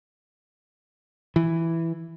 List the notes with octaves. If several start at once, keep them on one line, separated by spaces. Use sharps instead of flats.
E3